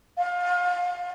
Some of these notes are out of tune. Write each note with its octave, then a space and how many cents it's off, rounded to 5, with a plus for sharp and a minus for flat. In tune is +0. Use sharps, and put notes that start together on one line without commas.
F5 +30